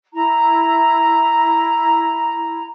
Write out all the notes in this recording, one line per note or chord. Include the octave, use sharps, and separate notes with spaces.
E4 A#5